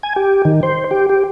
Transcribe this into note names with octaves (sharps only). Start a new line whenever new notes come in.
G#5
G4
D#3
C5
G4
G4